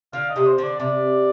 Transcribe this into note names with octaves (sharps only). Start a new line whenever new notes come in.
D3 F5
D#5
C3
C5
D3 D5
C3 D5